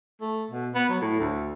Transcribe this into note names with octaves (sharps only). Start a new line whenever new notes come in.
A3
B2
B3
F#3
A2
D2